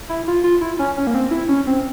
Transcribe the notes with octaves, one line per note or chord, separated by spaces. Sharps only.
E4
F4
F4
E4
C#4
C#4
A#3
C4
E4
C#4
C4